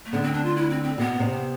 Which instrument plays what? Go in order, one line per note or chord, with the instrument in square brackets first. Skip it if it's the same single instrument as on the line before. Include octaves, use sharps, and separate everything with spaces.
[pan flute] A3
[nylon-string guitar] D2 D3 [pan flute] B3
[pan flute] C4
D4
F4
E4
C4
C4
[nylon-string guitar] B2 [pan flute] B3
[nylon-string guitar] C3